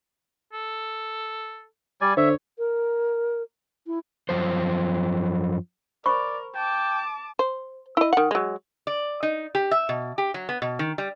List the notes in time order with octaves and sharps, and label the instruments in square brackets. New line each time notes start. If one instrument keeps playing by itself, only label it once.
[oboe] A4
[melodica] G3 D5 [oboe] G#5
[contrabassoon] D3 [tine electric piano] C5 [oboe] C#5 [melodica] E5
[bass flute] A#4
E4
[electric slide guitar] F#2 A#2 F3 C5
[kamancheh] A#4 [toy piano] C5 B5 C#6 [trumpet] D5
[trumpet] G5 [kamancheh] A5 D6
[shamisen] C5
E4 D#5
D#3 F#5
F#3 G#3
[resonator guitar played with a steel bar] D5
D#4
G4
E5
B2
G4
F#3
B3
B2
D#3
G3